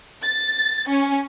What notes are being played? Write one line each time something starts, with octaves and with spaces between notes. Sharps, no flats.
A6
C#4